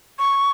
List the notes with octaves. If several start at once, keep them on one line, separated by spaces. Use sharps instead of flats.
C#6